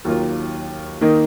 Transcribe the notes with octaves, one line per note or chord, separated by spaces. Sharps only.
D#2 D#3 F#3 A#3 F4
D#3 A#3 D#4